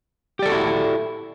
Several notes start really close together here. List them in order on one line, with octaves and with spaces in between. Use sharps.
G4 D5 A4 F#4 E4